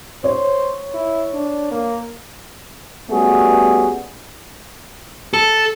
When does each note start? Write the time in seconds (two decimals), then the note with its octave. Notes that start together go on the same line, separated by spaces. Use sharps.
0.24 C5 C#5
0.94 E4
1.33 D4
1.71 A#3
3.10 G3 A3 B3 C#4 F#4 G#4
5.34 A4